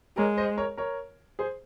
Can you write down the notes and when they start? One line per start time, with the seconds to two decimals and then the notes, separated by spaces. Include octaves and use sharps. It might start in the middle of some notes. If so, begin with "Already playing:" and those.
0.17 G#3 A#4 C#5
0.37 C5 D#5
0.57 A#4 C#5
0.77 A#4 C#5
1.39 G#4 C5